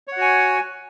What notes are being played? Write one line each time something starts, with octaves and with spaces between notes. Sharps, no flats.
F#4 C#5 F#5 G#5